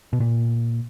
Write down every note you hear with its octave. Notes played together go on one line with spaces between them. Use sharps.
B2
A#2